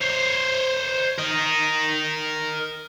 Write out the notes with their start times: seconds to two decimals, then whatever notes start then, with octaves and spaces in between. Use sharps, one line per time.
0.01 C5 C#5
1.18 A#4 D#5